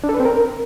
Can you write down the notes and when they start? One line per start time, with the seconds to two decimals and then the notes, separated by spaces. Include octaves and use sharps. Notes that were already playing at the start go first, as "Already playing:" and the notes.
0.04 D4
0.09 A4
0.14 B4
0.20 C4
0.25 A#4